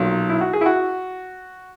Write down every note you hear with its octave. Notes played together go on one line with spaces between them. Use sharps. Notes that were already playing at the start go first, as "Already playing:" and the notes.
Already playing: B1 A#2 F#3
E4
F#4
G#4
E4
F#4